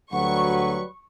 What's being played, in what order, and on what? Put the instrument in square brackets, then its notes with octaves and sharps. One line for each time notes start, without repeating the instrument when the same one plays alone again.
[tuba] D2 [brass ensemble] F#3 G3 B4 [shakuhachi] F#5 [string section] C#6